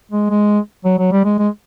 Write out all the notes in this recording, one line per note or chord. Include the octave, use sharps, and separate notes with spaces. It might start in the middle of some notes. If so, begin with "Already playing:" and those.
G#3
G#3
F#3
F#3
G3
G#3
G#3